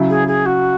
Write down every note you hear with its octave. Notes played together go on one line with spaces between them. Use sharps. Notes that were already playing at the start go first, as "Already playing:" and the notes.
Already playing: C#3 F#3 E4
G#4
G#4
F#4